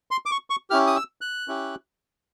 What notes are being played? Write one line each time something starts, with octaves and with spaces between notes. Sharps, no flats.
C6
D6
C#6
C#6
C#4 E4 G4 F6
D#6
E6
F#6
C#4 E4 G4